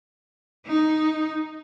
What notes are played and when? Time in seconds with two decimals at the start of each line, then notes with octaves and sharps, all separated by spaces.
0.66 D#4